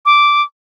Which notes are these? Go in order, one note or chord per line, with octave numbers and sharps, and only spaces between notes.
D6